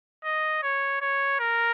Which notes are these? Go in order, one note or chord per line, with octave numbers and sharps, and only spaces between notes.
D#5
C#5
C#5
A#4